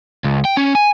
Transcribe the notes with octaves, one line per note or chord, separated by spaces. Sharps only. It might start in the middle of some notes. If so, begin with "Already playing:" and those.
C#2
G5
C#4
G#5